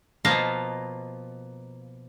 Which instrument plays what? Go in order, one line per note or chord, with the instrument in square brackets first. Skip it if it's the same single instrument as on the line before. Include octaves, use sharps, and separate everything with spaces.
[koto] B2 F3 A#3 D#5 F5 A#5